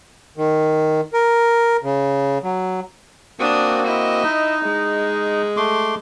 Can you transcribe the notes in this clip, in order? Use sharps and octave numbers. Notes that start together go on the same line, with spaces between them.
D#3
A#4
C#3
F#3
A#3 C4 D4 F#4 D#6
E4 D#5
D#4
G#3
A3 C6 D6